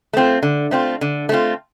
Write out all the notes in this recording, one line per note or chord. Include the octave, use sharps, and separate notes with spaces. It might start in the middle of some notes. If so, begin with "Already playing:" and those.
A3 C4 F4
D3
A3 C4 F4
D3
A3 C4 F4